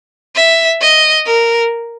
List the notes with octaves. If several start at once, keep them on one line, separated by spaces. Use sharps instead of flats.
E5
D#5
A#4